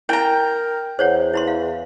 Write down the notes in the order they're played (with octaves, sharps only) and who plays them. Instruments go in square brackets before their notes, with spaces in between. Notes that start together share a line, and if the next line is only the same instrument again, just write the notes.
[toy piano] E4 [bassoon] A#4 [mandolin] G5 A#5
[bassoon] E2 [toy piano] C5 C#5 F#5
[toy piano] E4 B5 C6
F5